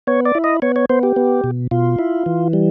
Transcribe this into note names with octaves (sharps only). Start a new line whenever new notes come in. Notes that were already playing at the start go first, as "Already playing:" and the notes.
B3 C#5
D5
E4
D#5
B3 C#5
C#5
B3 C5
G4
B3
B2
B2 F4
E4
E3
G3